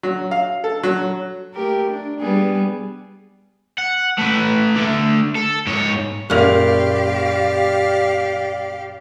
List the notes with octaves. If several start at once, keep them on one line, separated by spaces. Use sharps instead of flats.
F#3
F5
A4
F#3
A3 G4 A#4
D4
G3 B3 G#4
F#5
A3 B4
D3 A3
A4
G#2 C#5
F#1 A#2 G4 D5 F5 F#5 F7